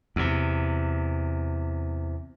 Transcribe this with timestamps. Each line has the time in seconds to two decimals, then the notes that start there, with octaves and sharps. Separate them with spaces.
0.16 E2 C3